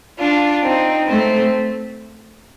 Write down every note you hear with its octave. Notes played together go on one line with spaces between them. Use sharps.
D4 F4
C4 D#4
A3 C4